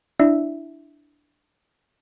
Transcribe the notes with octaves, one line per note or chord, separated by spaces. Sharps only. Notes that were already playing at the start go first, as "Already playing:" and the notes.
D4 E4 E5